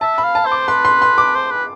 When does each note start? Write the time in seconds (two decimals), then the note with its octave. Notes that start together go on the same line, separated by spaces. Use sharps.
0.01 E5 A5
0.18 B5
0.24 F5
0.35 A5
0.46 C5
0.52 D6
0.68 B4 C6
0.85 C6
1.02 C6
1.18 D6
1.35 C5
1.51 B4